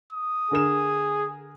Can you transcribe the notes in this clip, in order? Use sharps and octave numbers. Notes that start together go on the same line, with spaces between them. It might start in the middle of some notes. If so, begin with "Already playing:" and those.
D#6
D3 G#4 A#4 E7